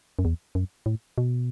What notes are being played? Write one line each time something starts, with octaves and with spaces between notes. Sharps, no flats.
F#2
E2
F#2
A2
B2